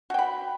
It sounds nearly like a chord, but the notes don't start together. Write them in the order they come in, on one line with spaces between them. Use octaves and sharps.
F#4 G5 B5